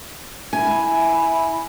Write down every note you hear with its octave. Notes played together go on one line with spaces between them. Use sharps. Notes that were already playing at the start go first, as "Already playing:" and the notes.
E4 G#5